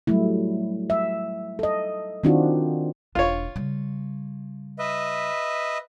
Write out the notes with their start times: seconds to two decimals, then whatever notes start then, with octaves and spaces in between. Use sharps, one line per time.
0.07 F#3 G3 A3 E4
0.90 E5
1.59 A4 D#5
2.24 D#3 C4 D4 D#4 F4 F#4
3.15 E1 D4 F4 C#5
3.56 C#3 G3
4.79 B4 D#5 E5